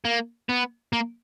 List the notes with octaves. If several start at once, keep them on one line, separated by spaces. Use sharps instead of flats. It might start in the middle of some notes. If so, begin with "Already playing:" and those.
A#3
B3
A#3